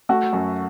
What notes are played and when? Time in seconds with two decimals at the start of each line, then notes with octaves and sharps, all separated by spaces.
0.09 A3 F#4
0.33 F#2